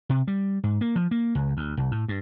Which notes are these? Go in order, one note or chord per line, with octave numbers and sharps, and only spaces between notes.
C3
G3
G#2
A#3
F3
A#3
C#2
D2
C2
A2
G2